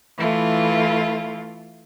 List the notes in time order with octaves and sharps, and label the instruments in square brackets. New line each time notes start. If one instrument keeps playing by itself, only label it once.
[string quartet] E3 A3 E4 F4